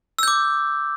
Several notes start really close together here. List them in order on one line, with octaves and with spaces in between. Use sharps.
E6 G6 D6